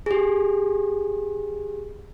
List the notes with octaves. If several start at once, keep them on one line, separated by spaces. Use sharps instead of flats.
G4 G#4